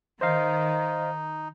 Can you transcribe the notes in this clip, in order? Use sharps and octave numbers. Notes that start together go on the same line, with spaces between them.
D#3 D#4 C5 D#5 F5